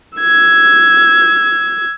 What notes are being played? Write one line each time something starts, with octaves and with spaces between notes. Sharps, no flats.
E6 G#6